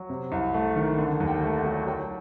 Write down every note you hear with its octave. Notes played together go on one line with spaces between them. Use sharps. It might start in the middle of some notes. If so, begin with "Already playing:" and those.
Already playing: F#3
C3
C2
A3
D#3
D3
D#2
G5
A3
F#5
F#3
F#3 G5